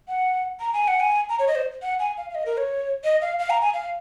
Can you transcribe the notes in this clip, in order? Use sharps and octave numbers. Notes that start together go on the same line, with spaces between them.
F#5
A#5
G#5
F#5
G#5
A#5
C#5
D#5
C5
F#5
G#5
F5
F5
D#5
A#4
C#5
D#5
F5
F5
A#5
G#5
F5